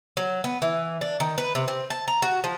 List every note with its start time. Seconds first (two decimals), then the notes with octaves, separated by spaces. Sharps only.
0.17 F#3
0.44 B3
0.62 E3
1.01 D4
1.20 D#3
1.38 B4
1.55 C3
1.68 C4
1.90 A5
2.08 A#5
2.22 F#4
2.44 F3